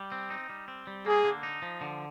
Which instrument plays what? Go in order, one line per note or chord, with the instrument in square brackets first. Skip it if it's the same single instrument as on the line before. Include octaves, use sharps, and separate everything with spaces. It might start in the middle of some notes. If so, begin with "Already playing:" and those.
Already playing: [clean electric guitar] G3
C4
D#4
G3
C4
G3
[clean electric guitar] A#3 [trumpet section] G#4
[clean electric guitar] D3
D#4
F3
D3